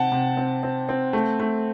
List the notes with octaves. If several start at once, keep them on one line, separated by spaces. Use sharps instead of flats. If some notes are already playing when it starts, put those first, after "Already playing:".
Already playing: C3 C4 F#5 G5 A5
C3
C4
C4
C4
A3
A3